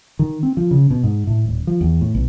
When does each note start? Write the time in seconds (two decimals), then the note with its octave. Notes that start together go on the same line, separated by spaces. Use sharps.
0.19 D#3
0.43 C4
0.57 F3
0.71 C#3
0.90 B2
1.03 G#2
1.27 A2
1.46 D#1
1.67 F3
1.81 E2
2.01 A2
2.15 B1